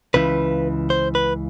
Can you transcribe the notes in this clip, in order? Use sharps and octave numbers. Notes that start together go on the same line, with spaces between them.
C#2 C#3 E3 B4
C5
B4